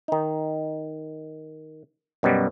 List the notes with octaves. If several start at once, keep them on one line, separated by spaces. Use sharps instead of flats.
D#3 D#4
F#2 B2 F#3 G3